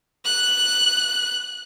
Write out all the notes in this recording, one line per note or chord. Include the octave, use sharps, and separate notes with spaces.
F#6